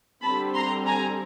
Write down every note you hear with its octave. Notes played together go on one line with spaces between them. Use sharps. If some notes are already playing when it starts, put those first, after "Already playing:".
D3 G3 C4 A5 B5
A#5 C6
G#5 A#5